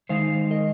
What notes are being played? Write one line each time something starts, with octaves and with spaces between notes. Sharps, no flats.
D#3 G#3 D#4 C5 F5
A#4 D#5